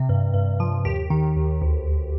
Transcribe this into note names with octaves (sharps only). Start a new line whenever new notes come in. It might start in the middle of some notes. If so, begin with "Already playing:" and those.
Already playing: C3
G2
G2
F3
D#2 G4
D#3
D#2
D2
D2